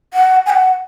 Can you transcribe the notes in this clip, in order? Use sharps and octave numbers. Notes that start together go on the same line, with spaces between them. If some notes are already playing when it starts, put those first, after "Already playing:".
F#5
G#5
F#5